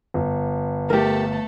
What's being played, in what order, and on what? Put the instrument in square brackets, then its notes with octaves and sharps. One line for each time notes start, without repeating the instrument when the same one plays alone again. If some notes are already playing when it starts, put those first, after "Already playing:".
[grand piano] G1
[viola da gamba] A3 A4 [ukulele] G4 A#4